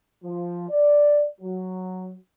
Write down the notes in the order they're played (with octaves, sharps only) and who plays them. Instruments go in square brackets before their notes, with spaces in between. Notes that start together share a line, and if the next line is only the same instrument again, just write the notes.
[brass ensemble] F3
D5
F#3